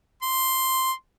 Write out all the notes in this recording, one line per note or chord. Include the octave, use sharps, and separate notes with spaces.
C6